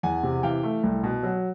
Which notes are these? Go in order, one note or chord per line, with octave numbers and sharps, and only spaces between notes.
E2 F#5 G#5
C3
E3 F5 G5
A3
C2
B2
F#3